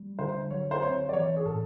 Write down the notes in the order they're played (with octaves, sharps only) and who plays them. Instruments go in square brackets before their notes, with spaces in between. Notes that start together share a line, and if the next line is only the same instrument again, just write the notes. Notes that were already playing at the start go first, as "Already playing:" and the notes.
Already playing: [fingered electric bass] G3
[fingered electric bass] D3 [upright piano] C5
[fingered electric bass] F#3 [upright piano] C#5
[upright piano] C5
[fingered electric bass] C4 [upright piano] C#5
[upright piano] D5
[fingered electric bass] E3 [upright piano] C#5
[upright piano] G#4
[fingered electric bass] A2 [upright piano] A4